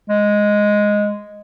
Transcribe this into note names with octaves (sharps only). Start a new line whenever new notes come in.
G#3